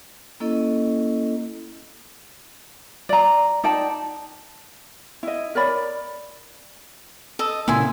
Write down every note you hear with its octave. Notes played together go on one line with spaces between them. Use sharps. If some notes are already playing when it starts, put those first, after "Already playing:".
A#3 C#4 E4 A4 D#5
D5 A#5
D#4 D5 G5 A5
E4 D#5
A#4 C#5 D5 B5
A4 D#5
A#2 C#3 A#3 E4 G#5 C6